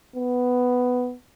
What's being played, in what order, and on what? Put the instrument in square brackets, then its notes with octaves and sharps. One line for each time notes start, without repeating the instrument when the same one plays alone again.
[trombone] B3